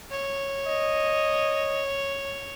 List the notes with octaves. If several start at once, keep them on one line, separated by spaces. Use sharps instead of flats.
C#5
D#5